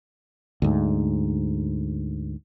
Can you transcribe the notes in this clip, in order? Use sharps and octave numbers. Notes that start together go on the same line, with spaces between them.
D2 G#2